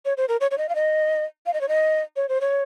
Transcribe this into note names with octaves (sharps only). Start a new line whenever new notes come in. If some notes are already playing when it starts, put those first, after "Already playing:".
C#5
C5
A#4
C#5
C#5
D#5
F5
D#5
F5
D#5
C#5
D#5
C#5
C5
C#5